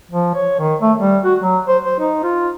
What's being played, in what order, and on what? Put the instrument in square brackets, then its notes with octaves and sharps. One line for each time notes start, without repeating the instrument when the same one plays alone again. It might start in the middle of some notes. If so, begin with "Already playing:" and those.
[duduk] F3
C#5
D#3
A3
G3
F#4
F#3
C5
C5
D#4
F4